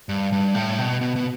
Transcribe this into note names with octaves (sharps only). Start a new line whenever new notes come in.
G2
G2
A2
B2
B2
B2